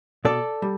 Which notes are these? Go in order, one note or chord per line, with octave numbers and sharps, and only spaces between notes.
B2 A4 D5
G3